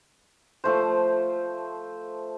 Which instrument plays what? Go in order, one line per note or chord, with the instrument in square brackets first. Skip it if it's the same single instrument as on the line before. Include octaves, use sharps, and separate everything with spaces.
[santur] F3 A3 C5